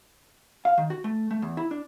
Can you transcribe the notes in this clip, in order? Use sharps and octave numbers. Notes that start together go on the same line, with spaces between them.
F5
D#3
F#4
A3
A3
E2
E4
D4